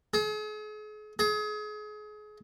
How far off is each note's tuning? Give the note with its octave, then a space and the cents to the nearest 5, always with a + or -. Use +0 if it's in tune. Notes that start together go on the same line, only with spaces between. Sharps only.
G#4 +40
G#4 +30